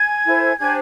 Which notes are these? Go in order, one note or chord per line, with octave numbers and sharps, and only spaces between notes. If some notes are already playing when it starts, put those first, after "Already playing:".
Already playing: G#5 G#6
E4 A4 C5
D4 G4 C5 G#5 G#6